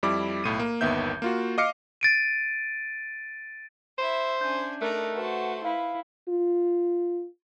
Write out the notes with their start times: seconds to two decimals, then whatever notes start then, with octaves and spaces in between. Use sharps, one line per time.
0.03 F2 G3 E4 D6
0.44 B1 A2 D#7
0.59 A#3
0.81 G1 D#2 D#3 B3 E5 G6
1.22 A#3 F4 F#4
1.58 D#5 F5 D6 F6 C7 C#7
2.01 A6 D7 D#7
3.98 E4 C5 E5
4.41 C#4 D4 G#5 G6
4.82 A3 D#4 A4 A#4 D5 F#6
5.16 F#4 B4 C5 F#5 A5
5.64 E4 B4 F5
6.29 F4